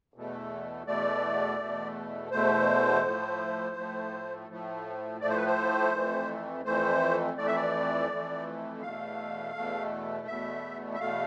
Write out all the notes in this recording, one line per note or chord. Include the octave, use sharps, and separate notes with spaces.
E2 B2 A3
E2 B2 A3 D5
E2 B2 A3
E2 B2 A3 C5
A2 F3 A3
A2 F3 A3
A2 F3 A3
A2 F3 A3 D5
C5
B4
C5
F2 E3 A3
F2 E3 A3 C5
F2 E3 A3 D5
E5
D5
F2 E3 A3
E2 B2 A3 F5
E2 B2 A3
E2 B2 A3 E5
E5
E2 B2 A3 F5